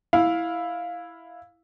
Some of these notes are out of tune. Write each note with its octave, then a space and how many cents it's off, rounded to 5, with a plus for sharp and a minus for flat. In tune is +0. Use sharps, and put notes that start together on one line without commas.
E4 +0 F5 +10